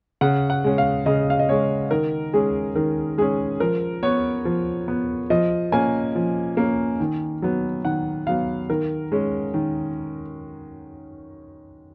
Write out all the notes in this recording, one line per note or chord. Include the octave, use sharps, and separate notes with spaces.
C#3 F#5
F#5
G#3 C#4
F5
C#3 D#5
F5
D#5
G#3 C#4 C#5
D#3 A#4
G#3 C#4 G#4
D#3 A#4
G#3 C#4 G#4
F3 A#4
B3 C#5
F3
B3
F3 D#5
A#3 C#4 G#5
F3
A#3 C#4
D#3
F#3 B3
D#3 F#5
F#3 B3 F5
D#3 A#4
G#3 C#4
D#3